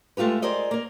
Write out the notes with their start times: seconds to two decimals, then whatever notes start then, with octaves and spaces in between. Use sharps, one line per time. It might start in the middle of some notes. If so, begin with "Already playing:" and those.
0.17 G#3 A3 F4 G4 B4
0.42 G#4 A#4 C5 D5 D#5
0.71 A#3 A#4